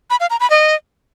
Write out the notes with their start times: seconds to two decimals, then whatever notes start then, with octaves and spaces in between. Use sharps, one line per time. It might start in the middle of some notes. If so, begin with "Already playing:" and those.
0.10 B5
0.20 F5
0.30 A#5
0.40 B5
0.50 D#5